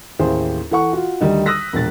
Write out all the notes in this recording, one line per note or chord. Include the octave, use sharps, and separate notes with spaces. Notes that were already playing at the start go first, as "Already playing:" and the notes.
A1 D#2 E4 G#4 C5
E3 A4 F#5 C#6
F4 F#4
D2 D#3 G3 D#4
D#6 E6 F#6 A#6 B6
E1 A#1 A6